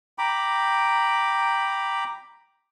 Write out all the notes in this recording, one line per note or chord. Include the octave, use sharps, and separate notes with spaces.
G5 A#5 B5 D6